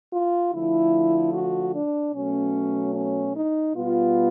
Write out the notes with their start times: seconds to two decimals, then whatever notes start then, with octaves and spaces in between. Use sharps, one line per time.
0.12 F4
0.53 D3 F3 A3 E4
1.33 F#4
1.74 D4
2.13 B2 F#3 A3 C#4
2.95 C#4
3.35 D#4
3.75 B2 G3 B3 F4